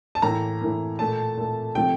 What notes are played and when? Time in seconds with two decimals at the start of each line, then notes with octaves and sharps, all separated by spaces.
0.15 A5
0.22 A2 E3 A#3 A#5
0.61 A2 E3 A#3
0.99 A#2 A3 A5
1.37 A#2 A3
1.75 C3 F3 A3 G5